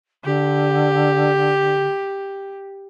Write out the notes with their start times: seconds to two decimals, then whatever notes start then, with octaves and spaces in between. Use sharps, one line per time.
0.24 D3 G4